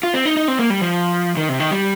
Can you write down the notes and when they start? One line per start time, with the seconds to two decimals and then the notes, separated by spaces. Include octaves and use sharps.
0.03 F4
0.14 C4
0.25 D#4
0.37 D#4
0.48 C4
0.59 A#3
0.70 G3
0.81 F3
1.37 D#3
1.49 C3
1.60 D#3
1.71 G3